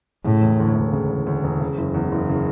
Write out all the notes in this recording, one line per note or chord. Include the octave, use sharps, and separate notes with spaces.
A2 C#3
E1
D2
E1
C#3
E1
D2
E1
C#3
F#1
E2
F#1
C#3